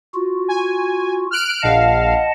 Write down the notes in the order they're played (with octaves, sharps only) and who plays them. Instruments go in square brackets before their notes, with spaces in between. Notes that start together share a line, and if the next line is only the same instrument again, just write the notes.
[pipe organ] F4 F#4
[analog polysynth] G#5
F6 F#6 D7
[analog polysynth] A#1 F5 [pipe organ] D#5 F#5 A5